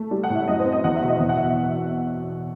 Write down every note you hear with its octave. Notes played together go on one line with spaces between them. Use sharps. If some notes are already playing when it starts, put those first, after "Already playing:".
Already playing: A3
G3
F#5
A2
E5
F#2 D#5
C5
C4
D#5
E2 F#5
E5
B2
D#5
E2 E5
F#5
B2 E5